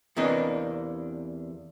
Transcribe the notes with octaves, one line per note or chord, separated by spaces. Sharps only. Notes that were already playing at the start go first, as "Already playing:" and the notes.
E2 C3 A#3 D4 B4 D#5